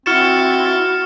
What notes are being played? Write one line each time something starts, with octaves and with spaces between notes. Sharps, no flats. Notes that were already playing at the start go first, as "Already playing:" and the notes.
C4 E4 F#4 C#6 F6 A6 C#7 E7